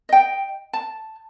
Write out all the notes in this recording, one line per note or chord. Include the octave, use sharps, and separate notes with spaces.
D#5 G5
A5